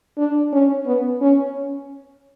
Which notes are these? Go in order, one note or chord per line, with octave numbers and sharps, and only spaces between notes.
D4
C#4
B3
C#4